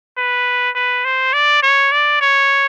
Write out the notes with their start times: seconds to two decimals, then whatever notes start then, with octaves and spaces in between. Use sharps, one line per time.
0.17 B4
0.75 B4
1.05 C5
1.33 D5
1.63 C#5
1.92 D5
2.21 C#5